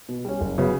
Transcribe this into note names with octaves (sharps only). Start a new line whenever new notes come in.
B2
G3 C#4
F#1
C#3 F#3 B3